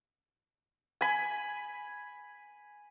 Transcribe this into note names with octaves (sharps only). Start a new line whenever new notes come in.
G#5 B5